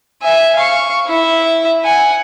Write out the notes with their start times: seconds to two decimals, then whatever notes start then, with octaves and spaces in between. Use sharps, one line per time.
0.22 E5 G#5
0.56 F5 C#6
1.07 E4 E5
1.84 F#5 G#5